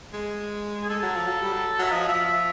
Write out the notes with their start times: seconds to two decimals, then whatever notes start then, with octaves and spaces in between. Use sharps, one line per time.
0.13 G#3
0.83 G#4
0.89 G#3 A4
1.03 F#3
1.15 F3
1.27 F#3
1.41 G3
1.53 F#3
1.79 F#3 E5
1.91 F3 D#5
2.08 F3 E5
2.25 F3 E5